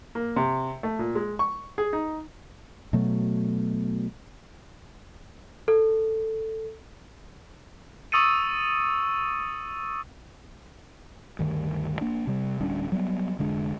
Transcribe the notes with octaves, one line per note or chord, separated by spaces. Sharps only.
A#3
C3
A3
A#2
G#3
C#6
G#4
D#4
B2 F#3 A3
A4
C#6 D#6 E6 A6 C#7 D#7
D2 G2 D#3
A#3 D4
C3 G3
D1 G3 C#4 D4
F#3 G3 A#3 B3
F1 D3 G#3 D4